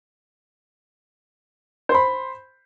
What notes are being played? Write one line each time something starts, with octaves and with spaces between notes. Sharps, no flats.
C5 B5 C6